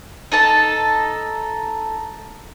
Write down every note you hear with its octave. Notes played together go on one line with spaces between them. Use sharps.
D#4 A4 A5